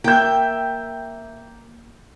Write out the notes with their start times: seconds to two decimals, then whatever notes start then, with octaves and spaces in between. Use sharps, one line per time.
0.04 A#3 E5 G5 G6